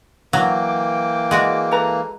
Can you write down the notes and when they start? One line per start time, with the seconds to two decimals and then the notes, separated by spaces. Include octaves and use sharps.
0.33 E3 F#3 A#3 G5 D6
1.31 G#3 F#4 D5
1.72 A4 B4 A#5